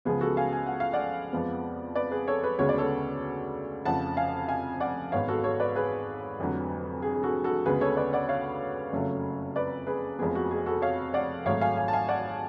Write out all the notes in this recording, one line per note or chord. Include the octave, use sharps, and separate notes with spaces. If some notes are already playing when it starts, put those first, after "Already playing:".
C#2 C#3 F3 G#3 B3 G#4
F#4 A4
F5 G#5
G#5
F#5
F5
D5 F#5
F2 F3 G#3 B3
B4 D5
G#4 B4
A4 C#5
G#4 B4
D2 C#3 G#3 B3 C#5
D5
A4 C#5
F1 F2 C#3 F3 F#5 A5
F5 G#5
F5 G#5
D5 F#5
G#1 G#2 G#3 B3 C#5 F5
F#4 A4
A4 C#5
B4 D5
G#4 B4
F1 F2 D3 F#3
G#4
G#4
F#4 A4
F#4 A4
D2 C#3 G#3 B3 G#4 B4
A4 C#5
B4 D5
D5 F#5
C#5 F5
F#1 F2 C#3 F#3 A3
B4 D5
G#4 B4
F1 F2 F3 G#3 B3 G#4
F#4
G#4
F#4 A4
C#5 F5
D5 F#5
G#1 G#2 F#3 A3 C#5 F5
F5 G#5
F5 G#5
A5
F5 G#5
D5 F#5